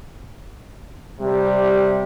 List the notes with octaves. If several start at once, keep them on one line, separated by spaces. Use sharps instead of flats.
C3 G3